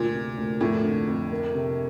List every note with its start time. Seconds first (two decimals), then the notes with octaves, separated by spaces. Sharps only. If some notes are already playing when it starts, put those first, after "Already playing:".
Already playing: D2 A#2
0.14 C3
0.37 D2
0.61 F2 A2
0.84 D3
1.08 F2
1.31 A#3
1.54 C3